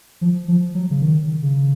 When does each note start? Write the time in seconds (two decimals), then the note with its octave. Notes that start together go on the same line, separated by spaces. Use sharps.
0.21 F3
0.48 F3
0.75 F#3
0.90 C#3
1.02 D#3
1.43 C#3